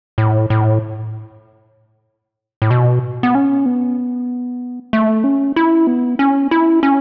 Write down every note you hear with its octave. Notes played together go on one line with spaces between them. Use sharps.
A2
A2
A2
B2
B3
C#4
B3
A3
C#4
E4
B3
C#4
E4
C#4